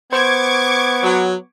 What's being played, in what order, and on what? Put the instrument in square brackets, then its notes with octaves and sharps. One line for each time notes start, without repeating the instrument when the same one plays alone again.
[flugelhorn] B3 [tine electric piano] C5 [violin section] C#6 D6 G#6
[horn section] F#3